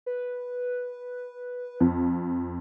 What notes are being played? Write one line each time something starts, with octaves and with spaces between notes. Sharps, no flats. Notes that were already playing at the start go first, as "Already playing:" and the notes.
B4
F2